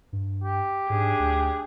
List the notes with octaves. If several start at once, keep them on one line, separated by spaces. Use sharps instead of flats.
G2
G4
G#2 D4 G#4
D2